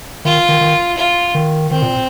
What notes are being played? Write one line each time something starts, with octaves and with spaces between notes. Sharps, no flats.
D#3 F4
D#3
D#3
F4
D#3
D#3 C4
A#2